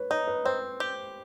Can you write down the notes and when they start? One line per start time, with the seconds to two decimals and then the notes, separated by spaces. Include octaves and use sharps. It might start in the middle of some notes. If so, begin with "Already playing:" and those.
Already playing: B4 C#5
0.10 D#4 C#5
0.27 B4
0.45 C4 C5
0.80 G4